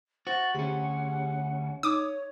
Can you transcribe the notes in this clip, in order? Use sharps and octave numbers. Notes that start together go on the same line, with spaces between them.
F#4 C5 E5 A6
D2 C#4 G4 G#4 F#5
D#4 C#5 D6 D#6